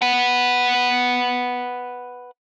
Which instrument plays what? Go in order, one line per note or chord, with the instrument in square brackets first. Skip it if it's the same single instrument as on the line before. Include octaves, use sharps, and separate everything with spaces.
[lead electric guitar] B4 F#5